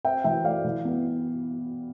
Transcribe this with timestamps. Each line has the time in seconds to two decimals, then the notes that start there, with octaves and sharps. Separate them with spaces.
0.05 C4 E5 G5
0.24 E3 E5 G5
0.44 A3 D5 F5
0.65 E3
0.85 B3